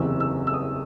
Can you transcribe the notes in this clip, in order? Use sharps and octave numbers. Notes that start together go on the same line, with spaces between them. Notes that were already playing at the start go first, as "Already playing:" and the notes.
Already playing: F#1 E2 C3 E6
E6
E6
D#6